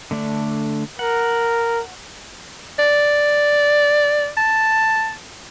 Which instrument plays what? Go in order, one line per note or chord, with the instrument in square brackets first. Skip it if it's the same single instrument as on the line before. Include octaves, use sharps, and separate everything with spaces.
[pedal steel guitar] D3 A3 D4
[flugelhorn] A#4 [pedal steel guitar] F#5
[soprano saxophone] D5
A5